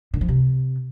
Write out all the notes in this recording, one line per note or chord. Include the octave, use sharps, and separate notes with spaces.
D3
F3
C3